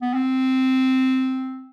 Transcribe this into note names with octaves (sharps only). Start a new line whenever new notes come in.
B3
C4